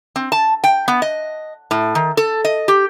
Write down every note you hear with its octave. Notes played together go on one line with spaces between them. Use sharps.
C4
A5
G5
B3
D#5
A2
D#3
A4
D#5
G4